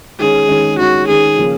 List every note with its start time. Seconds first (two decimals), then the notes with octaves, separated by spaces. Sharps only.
0.19 D#3 G#3 C#4 G#4
0.48 D#3 G#3 C#4
0.78 D#3 G#3 C#4 F#4
1.07 D#3 G#3 C#4 G#4
1.37 C#3 F3 A#3 C#4